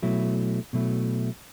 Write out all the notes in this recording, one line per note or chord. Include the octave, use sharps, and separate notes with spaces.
B2 F#3 A3 E4
B2 F#3 A3 E4